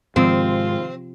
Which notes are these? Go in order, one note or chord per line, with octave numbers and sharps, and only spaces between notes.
G#2 C3 D#3 F3 G#3 C4 F4